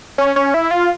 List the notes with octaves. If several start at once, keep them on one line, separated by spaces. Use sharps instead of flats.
C#4
C#4
E4
F4